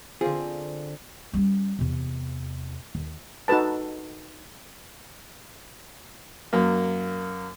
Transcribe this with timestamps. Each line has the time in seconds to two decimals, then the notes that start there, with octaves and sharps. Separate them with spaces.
0.21 D3 C4 F4 G#4
1.33 G3 C#4
1.79 E2 C3
2.95 D#2
3.48 D#4 F#4 A4 B4 A5
6.53 F#2 A#3